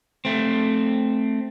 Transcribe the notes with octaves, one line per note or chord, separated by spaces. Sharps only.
A3 C4